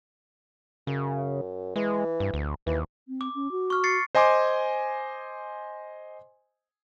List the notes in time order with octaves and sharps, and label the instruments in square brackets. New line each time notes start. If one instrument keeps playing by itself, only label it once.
[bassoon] F#2 [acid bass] C#3
[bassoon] E3 [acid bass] G#3
[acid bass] G2
D2
[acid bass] D#2 [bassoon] E3
[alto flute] C4
[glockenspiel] D6
[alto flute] C#4
F#4
[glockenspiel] C#6 F6
A6 C7 C#7
[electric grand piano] C5 D#5 G#5 C6 D6